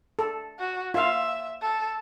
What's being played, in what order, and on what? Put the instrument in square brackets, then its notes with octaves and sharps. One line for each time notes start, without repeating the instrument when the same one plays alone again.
[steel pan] A4
[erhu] F#4
[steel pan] F4 F5 [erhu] E5
[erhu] A4